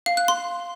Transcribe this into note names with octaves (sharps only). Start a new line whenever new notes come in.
F5
F#6
C6